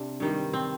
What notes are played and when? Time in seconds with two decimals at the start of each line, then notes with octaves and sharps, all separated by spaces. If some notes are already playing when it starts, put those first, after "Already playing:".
Already playing: C3 D4
0.20 G2 D#3 G3
0.53 C4